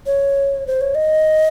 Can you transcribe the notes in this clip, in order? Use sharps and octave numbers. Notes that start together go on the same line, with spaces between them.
C#5
C5
C#5
D#5